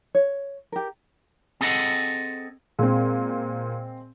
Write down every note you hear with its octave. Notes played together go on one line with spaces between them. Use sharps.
C#5
G4 A#4
C4 G#4 A4 D#5 F#5
A#2 G#3 C4